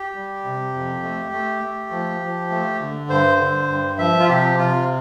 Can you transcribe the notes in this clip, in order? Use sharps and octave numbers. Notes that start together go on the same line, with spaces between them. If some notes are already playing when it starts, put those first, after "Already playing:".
Already playing: G4
G3
C3
F2
A3
A3
A3
F3
F3
A3
D3
G2 C5
D3
G2
F3 E5
F4
C3 G4
C3 F4